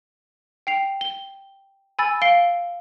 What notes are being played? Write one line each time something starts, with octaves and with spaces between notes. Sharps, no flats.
G5 C7 F7
G7
G#5 B5 E6 A6
F5 C7 D7 G7